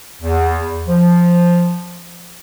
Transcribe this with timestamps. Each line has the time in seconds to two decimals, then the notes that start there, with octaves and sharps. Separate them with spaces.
0.22 E2
0.88 F3